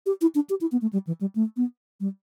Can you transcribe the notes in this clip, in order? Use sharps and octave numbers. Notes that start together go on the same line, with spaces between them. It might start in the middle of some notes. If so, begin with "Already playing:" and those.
G4
E4
D4
G4
E4
B3
A3
G3
E3
G3
A3
B3
G3